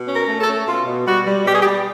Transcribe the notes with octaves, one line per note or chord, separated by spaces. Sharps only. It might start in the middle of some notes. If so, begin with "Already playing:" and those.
Already playing: B2
C#4
A#4
A3
A4
C#4
B2 F4
B2
G3 F#4
G3
B2 G4
G#4
G4
G3